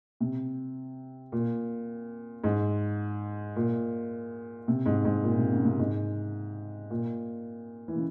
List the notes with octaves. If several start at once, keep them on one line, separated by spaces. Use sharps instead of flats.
C3
A#2
G#2
A#2
C3
G#2
G#2
A#2
C3
C#3
C3
G#2
A#2
E3
C#3